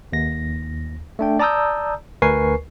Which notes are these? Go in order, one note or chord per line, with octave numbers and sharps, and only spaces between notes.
D#2 A#6
A3 D4 G5
D5 A5 A#5 D#6 E6 G6
D2 A#4 B4 G#5 C#6 C7